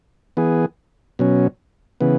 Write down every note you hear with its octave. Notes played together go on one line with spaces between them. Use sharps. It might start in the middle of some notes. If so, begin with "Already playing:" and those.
E3 B3 G#4
B2 F#3 C#4
C#3 E3 B3